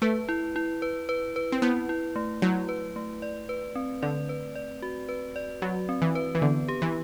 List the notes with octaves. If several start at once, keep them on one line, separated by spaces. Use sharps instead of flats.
A3 B4
E4
E4
B4
B4
B4
C4
B3 E4
E4
A3
F#3 E4
B4
A3
D5
B4
C4
D3 D5
B4
D5
F#4
B4
D5
F#3 F#4
C4
E3
B4
E3
D3 B3
G4
E3